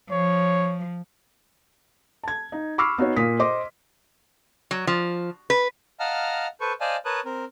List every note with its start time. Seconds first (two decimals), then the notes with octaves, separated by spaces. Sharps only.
0.11 F3 C#5
2.23 A5 G#6
2.52 D#4
2.78 B5 C#6 D6 E6 F6 C7
2.98 B3 D#4 F#4 C#5
3.16 A#2 F4 A#4 D#6 B6
3.39 C5 D#5 C6 D6
4.71 F#3
4.87 F3
5.50 B4
6.00 D#5 F5 F#5 A5 A#5 F6
6.61 A4 B4 C5 C#6
6.81 C5 D5 D#5 F5 G#5 A5
7.05 A#4 B4 C#5 A5 D#6 F#6
7.25 C4 A#4